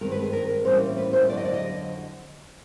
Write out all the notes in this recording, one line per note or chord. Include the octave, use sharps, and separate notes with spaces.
G2 D#3 G#3 C4 A#4
B4
G#4
A#4
A2 E3 G3 A#3 C#4 C5
B4
C5
F2 D3 F#3 D5
D#5
D5
D#5